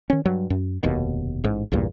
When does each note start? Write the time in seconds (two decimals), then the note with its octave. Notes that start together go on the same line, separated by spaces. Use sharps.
0.10 D#3 C#4
0.25 G2 F#3
0.50 F#2
0.83 F1 D#2 B2
1.44 A1 G#2
1.72 A#1 E2 G2 A#2